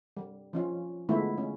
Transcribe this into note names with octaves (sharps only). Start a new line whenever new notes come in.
G3
F3 C#4 F4
D3 G#3 A3 B3 E4 F4
C#4